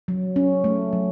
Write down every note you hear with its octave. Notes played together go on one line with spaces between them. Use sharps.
F#3
C#4
A3
F#3